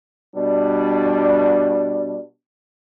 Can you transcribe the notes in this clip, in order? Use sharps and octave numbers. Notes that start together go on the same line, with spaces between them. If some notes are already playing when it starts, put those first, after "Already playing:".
B2 G3 D4